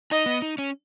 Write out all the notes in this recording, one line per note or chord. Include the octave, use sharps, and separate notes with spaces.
D#4 D#5
B3
D#4
C#4